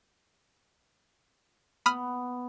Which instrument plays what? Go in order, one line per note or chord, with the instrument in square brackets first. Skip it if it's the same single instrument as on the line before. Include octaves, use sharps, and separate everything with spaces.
[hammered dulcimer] B3 [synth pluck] B5 D#6 F6